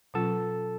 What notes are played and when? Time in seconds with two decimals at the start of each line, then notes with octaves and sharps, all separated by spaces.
0.14 B2 F#3 C#4 F4 A4 A5